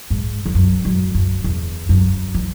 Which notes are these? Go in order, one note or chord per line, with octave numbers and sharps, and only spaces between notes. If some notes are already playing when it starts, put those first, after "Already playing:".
G#2
E2
F#2
F#2
F#2
E2
F#2
E3